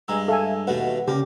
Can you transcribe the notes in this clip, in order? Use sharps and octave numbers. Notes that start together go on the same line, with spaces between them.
G2 G#3 G#5 A#5 E6
A4 E5 F5 G#5
D#2 B2 A3 B4 F#5
C#3 A#3 C#4 G4